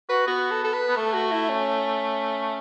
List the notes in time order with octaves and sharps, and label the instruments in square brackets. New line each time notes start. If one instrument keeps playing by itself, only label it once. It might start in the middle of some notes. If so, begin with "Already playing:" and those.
[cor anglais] F#4 [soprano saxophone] B4
[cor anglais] B3 [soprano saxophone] F#4
[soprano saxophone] A4
A4
B4
[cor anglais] B3
[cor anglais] A3 [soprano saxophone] A4
[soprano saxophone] F#4
E4
C#4